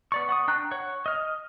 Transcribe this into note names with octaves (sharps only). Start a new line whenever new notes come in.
B3 D5 C#6
F#5 C#6 D#6
D4 G5 A#5 F#6
C#5 F#5
D#5 F6